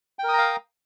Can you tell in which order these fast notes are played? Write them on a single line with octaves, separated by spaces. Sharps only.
G5 A#4 D#6 A#5 F5